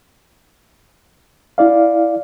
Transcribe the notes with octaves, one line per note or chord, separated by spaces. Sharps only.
E4 D5 F5